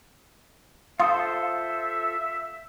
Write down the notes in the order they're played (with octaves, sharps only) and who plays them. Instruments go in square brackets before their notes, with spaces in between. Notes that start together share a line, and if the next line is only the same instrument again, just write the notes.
[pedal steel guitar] F4 A4 C5 [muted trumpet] E5 [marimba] F5 C6 D#6